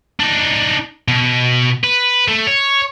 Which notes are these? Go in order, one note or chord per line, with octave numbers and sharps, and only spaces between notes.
D4 D#4
B2
B4
A3
C#5